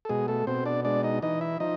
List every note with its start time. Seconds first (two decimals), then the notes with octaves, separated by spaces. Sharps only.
0.05 A4
0.09 B2 G#3 G#4
0.28 A3 A4
0.47 B2 C4 C5
0.65 D4 D5
0.85 G#3 D4 D5
1.03 D#4 D#5
1.22 E3 D#4 D#5
1.41 E4 E5
1.60 F3 D#4 D#5